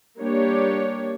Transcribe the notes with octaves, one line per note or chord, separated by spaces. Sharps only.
G3 A#3 D4 G4 C#5